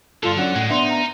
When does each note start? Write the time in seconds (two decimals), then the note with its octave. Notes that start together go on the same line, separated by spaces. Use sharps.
0.23 G2 D3 F4 A4
0.37 F#3 C#4 D4 F#5
0.55 A2 D#3 G#3
0.70 B3 D4 D#4 E5 C6
0.89 A#5